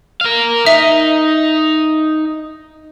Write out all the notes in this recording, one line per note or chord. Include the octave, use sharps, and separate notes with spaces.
A#4 F5
D#4 E5